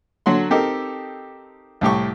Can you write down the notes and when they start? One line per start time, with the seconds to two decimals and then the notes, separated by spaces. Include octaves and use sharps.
0.26 D3 F#3 F#5 C6
0.50 C4 D#4 G4 A4 A#4
1.81 C2 A2 G4 C#6